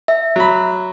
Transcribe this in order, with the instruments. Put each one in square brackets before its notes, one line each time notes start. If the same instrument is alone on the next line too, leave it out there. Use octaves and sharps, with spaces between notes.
[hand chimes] E5
[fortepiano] F#3 B5